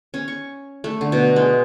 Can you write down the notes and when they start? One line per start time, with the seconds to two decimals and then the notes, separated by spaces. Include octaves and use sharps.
0.14 C#4
0.28 C#6
0.84 A3
1.01 D3
1.12 B2
1.36 G#3